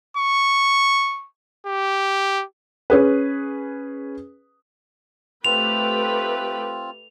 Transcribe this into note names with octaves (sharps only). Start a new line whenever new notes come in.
C#6
G4
C#4 G#4 B4
A3 C4 F4 G4 B4 F7